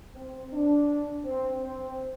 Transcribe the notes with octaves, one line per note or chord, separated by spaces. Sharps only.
C4
D4
C4
C4